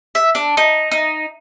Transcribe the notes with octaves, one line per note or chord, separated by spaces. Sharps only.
E5
D4
D#4
D#4